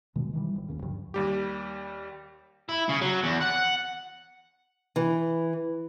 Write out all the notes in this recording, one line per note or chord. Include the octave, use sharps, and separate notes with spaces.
D#1 B2 D#3 G#3
D#3 E3 F#3 G3
G1
G1 D#2 C#3
D2 G2 D3 F3
D#2 G3 G4
E4
C#3
F#3
E2
F#5
E3